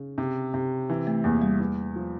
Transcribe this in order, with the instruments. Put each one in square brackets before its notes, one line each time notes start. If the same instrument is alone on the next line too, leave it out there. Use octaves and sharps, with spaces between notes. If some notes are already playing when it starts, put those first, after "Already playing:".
Already playing: [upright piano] C#3
C3
C3
E3
[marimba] A3
[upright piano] E2 [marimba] A#3
[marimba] G3
[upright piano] E2
F3